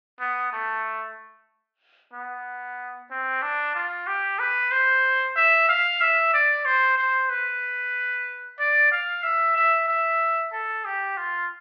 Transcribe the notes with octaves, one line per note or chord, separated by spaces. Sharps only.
B3
A3
B3
C4
D4
F4
G4
B4
C5
E5
F5
E5
D5
C5
C5
B4
D5
F5
E5
E5
E5
A4
G4
F4